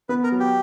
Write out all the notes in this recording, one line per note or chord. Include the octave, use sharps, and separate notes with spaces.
B3 B4
A#4
F#3
G4